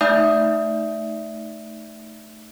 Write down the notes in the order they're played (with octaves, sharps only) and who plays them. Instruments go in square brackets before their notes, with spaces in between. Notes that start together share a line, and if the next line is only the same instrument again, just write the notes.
[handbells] A3 D#4 D5 E5 D#6 G6